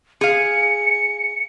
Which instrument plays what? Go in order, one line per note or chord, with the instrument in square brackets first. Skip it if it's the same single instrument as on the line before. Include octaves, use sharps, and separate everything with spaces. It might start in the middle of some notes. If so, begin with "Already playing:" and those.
[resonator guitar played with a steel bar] G#4 F5 [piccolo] C#7